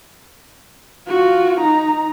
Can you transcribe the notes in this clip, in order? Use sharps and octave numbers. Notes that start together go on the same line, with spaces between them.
F4 F#4
D#4 A#5